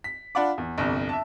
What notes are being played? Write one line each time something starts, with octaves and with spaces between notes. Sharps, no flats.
B6
D4 F4 D5 F#5 B5 D6
E2
G1 C2 F2
E5 A5